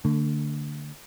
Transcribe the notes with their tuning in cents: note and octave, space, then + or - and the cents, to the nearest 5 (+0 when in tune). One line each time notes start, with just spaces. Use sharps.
D3 +0 A3 +35